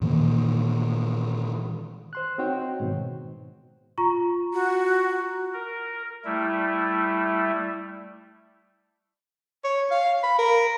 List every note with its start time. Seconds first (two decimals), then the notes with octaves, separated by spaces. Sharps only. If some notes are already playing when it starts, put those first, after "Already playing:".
0.01 A#2 D#3 E3 A#3
2.13 C5 C6 F#6
2.38 C4 D#4 F#4 C5 C#5 G5
2.80 G#2 B2 D#3
3.98 F4 A#5 C#6
4.53 F#4
5.53 A#4
6.25 G3 A3 E4
9.64 C#5
9.91 F5
10.24 B5
10.39 A#4